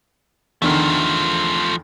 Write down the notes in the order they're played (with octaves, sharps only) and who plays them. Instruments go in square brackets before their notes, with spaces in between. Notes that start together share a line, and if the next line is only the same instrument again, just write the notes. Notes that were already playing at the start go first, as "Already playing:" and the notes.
[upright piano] E2 D3 D#3 [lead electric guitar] F3 A3